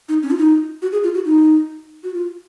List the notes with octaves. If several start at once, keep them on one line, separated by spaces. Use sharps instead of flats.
D#4
C#4
F4
D#4
F#4
G#4
F4
F#4
D#4
F#4
F4